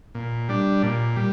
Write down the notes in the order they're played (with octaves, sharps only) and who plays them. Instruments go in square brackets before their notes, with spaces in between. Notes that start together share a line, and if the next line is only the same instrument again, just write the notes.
[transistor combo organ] A#2
G3 D4
A#2
G3